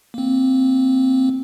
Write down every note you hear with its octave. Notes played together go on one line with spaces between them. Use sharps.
A#3 C4